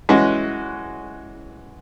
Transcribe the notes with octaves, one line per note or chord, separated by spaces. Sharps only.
E3 G#3 C#4 F#4